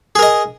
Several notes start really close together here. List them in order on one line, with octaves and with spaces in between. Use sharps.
G#4 A#4 D#5